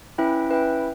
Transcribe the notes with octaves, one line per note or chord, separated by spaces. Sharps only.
C#4 E4 B4 E5 G5
C#4 E4 B4 E5 G5